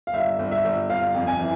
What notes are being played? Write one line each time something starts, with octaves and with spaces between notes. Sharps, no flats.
F5
G1 E5
G1
E5
G1
G1 F5
F2
G#5
E3